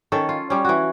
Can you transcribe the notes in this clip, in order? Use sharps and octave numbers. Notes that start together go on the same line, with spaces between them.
D#3 C#4 A4
F4
G3 C#4
E3 F#4